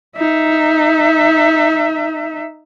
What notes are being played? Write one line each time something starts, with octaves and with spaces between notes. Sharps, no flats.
D#4 E5